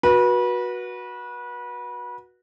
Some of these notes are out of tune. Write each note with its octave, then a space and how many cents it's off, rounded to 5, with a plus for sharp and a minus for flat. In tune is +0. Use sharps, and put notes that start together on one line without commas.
F#4 -10 B4 -30